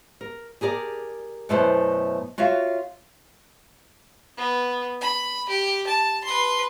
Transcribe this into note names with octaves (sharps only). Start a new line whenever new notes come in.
A#4
G4 G#4 A#4 D5
F#2 B2 A3 E4 B4 C5
F4 F#4 C#5 E5 F5
B3
B5
G4
A5
B4 C6